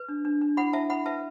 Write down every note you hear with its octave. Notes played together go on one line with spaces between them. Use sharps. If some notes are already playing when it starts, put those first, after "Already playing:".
Already playing: B4
D4
D4
D4
E4 F#5 B5
E4 E5 A5
E4 F#5 B5
B4 E5 A5